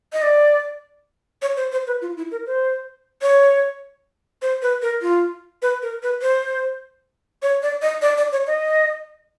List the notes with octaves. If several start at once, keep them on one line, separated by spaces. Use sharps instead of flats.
D#5
D5
C#5
C5
C5
B4
F4
E4
A#4
C5
C#5
C5
B4
A#4
F4
B4
A#4
B4
C5
C#5
D5
D#5
D5
D5
C#5
D#5